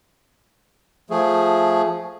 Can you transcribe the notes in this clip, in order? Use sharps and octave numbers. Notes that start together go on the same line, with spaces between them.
F3 A3 G#4